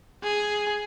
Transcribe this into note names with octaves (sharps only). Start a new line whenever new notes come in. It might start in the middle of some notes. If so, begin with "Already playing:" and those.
G#4